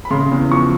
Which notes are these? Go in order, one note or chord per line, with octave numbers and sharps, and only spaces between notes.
B5
C#3 C6
E2
F3 C#6